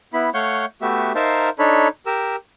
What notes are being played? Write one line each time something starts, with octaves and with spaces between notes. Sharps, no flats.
B3 E4 B5
A3 C#5 F5 F#5 C#6 G6
A3 B3 F#4 G4 E5
D#4 A#4 C5 E5 F5 A5
D4 D#4 A4 C#5 B5
G4 A#4 E6